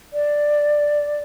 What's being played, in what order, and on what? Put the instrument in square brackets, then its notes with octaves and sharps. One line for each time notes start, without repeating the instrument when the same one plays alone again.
[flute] D5